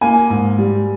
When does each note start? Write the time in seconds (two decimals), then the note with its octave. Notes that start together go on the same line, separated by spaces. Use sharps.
0.01 A#3 G#5
0.30 G#2
0.58 G3